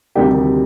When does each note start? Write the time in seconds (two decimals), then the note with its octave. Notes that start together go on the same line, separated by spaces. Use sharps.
0.15 D2 C3 D#3 G3 D#4 G4